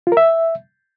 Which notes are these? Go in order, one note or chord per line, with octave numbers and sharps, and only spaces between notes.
F4
A#4
E5